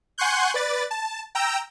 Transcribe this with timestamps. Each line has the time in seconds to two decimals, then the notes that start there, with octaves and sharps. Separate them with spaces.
0.18 F#5 G#5 C6 C#6 F#6 G6
0.54 B4 D5 A6
0.91 A5
1.35 G5 A#5 E6